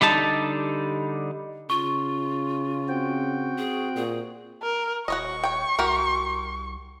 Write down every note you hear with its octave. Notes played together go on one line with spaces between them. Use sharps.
D3 G3 D#4 A5
C#3 F4 C#6
C4 F#4 G5
G#4
A#2 G#4
A#4
D#1 F#4 C#5 D#5 C#6
C#5 G5
C2 F#4 G4 A#4